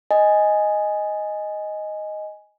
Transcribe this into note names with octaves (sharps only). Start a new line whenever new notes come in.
D#5 G#5